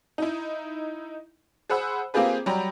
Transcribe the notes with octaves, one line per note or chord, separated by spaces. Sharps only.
D#4 E4
G#4 C5 F#5 B5 E6
A#3 C4 F4 G4 G#4 B4
F#3 G3 G5 A#5 B5